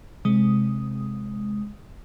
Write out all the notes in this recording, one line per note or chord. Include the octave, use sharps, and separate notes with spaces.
C3 G#3 D#6